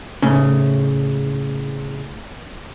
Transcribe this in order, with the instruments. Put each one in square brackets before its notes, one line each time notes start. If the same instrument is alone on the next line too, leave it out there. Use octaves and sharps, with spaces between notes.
[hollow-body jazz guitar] A2 C#3